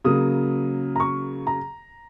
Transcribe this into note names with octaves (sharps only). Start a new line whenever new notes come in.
C#3 F#3 A#3 D#6
A#5
C#6
A#5